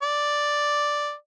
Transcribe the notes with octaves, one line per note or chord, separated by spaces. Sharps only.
D5